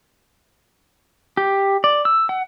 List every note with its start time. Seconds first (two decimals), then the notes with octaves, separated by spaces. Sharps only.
1.37 G4
1.84 D5
2.05 E6
2.29 F#5